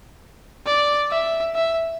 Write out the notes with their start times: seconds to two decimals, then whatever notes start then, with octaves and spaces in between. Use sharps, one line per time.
0.67 D5
1.11 E5
1.55 E5